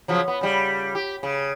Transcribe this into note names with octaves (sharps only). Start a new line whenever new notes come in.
C#3 F3 F#3
B3
C#3 G3
G4
C#3